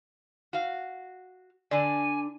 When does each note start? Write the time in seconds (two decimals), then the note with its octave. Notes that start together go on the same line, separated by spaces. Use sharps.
0.53 F#4 F5
1.71 D3 D4 D5 G#5